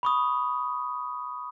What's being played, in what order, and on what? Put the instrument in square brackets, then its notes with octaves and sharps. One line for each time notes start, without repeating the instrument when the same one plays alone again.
[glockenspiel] B5 C#6 D#6